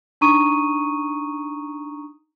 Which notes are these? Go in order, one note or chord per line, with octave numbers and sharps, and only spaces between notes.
D4 D#4 A#5 C#6 D#6 D#7